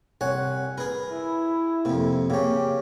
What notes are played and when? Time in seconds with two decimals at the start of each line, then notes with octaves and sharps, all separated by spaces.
0.21 C2 C#5 F#5 G#5
0.78 G#4 A#4 B4
1.12 E4
1.85 F2 C3 A#3
2.30 C#3 A#3 C#4 G4